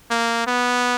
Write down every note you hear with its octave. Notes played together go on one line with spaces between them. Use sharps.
A#3
B3